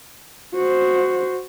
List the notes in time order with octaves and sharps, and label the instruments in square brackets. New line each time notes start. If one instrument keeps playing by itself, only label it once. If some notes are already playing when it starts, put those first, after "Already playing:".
[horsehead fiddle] F#4 C5